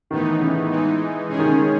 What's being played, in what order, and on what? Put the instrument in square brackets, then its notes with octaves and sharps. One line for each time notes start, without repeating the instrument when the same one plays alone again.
[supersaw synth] A2 E3 B3 D#4 [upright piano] D#3
[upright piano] C#3
[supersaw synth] E3 G#3 D#4
[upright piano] C#3 [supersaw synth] G#3 C#4 G#4
[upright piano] D#3
C#3
D#3